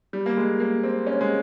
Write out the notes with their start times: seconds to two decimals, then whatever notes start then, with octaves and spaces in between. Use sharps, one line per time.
0.13 G3
0.26 A#3
0.37 G#3
0.60 A#3
0.83 C4
1.07 C#4
1.21 G#3